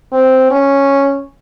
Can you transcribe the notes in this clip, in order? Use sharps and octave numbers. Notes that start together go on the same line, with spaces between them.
C4
C#4